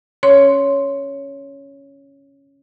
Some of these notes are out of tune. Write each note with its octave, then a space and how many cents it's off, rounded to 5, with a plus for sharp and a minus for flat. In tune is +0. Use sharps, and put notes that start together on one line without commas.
C#4 +0 C#5 +5 C6 +0